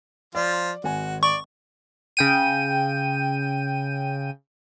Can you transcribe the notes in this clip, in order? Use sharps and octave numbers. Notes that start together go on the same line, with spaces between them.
F3 F4 D5
G#1 F#4 G#5
D5 C#6
C#3 G5 D#7